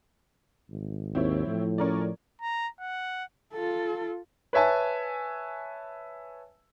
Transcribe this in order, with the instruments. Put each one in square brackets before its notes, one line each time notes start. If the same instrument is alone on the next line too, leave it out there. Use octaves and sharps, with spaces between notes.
[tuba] G#1
[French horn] D#2 [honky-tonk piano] C4 E4 C#5
[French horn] A2 [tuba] F3
[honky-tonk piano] C#4 A#4 D5
[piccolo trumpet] A#5
F#5
[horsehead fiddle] F4 A4
[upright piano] B4 C#5 E5 G#5 A5